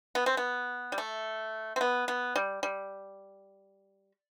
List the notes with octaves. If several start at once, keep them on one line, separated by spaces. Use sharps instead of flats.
B3
C4
B3
G3
A3
C4
B3
B3
G3
G3